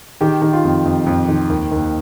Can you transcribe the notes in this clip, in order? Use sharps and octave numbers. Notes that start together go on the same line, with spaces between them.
D#3 G4
D#3
F4
F2
F2
F2
D#3
D#2
D#2